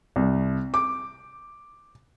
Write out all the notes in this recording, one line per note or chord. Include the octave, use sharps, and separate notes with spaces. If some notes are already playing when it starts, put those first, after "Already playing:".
C2
D6